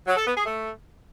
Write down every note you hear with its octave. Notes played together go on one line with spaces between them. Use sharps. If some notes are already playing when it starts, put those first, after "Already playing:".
F#3
A4
B3
G#4
A3